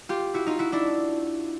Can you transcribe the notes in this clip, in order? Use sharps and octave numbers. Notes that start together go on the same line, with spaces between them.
F4 G4
E4 F#4
D#4 F4
E4 F#4
D4 E4